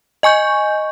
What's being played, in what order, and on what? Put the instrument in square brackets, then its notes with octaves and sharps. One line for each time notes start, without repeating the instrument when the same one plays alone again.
[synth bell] D#5 G#5 C#6 G6